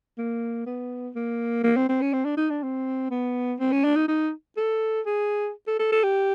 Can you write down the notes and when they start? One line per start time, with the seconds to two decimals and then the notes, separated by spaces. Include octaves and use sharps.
0.18 A#3
0.66 B3
1.15 A#3
1.63 A#3
1.77 C4
1.89 C4
2.01 C#4
2.13 C4
2.24 D4
2.37 D#4
2.50 D4
2.62 C4
3.11 B3
3.60 C4
3.72 C#4
3.84 D4
3.96 D#4
4.08 D#4
4.57 A4
5.06 G#4
5.67 A4
5.79 A4
5.92 A4
6.03 G4